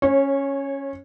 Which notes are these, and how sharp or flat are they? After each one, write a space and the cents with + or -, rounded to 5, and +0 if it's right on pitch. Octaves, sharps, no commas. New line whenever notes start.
C#4 -5 C#5 -25